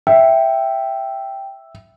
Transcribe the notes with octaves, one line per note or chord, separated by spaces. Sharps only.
E5 G5